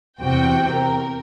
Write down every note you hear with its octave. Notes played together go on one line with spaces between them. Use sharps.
E2 C3 F#4 G5
A#4